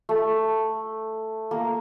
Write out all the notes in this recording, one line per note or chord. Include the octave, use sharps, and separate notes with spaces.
A3
A#3